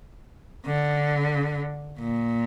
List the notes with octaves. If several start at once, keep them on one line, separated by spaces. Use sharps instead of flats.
D3
A#2